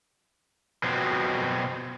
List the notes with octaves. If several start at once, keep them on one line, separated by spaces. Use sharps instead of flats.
B2 F3 F#3 C4